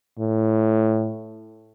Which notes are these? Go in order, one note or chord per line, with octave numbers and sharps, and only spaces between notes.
A2